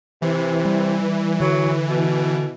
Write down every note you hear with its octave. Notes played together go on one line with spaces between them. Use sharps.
C3 E3
G3
D3 F#3
B2